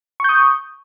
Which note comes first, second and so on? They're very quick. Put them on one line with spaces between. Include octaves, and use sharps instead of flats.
C#6 G6 D#6